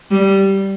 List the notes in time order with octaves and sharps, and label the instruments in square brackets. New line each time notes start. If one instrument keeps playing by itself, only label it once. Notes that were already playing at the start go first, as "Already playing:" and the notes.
[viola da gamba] G3